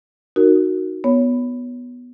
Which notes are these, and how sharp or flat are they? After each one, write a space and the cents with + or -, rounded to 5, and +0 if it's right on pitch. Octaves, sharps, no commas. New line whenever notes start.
D#4 -5 F#4 +0 A#4 -15
B3 +0 C#5 +15